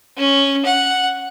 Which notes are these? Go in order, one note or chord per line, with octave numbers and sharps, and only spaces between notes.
C#4
F#5